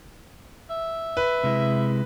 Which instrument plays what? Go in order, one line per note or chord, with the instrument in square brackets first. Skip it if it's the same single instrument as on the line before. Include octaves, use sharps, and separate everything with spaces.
[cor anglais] E5
[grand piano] B4
[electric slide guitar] C3 G#3 E4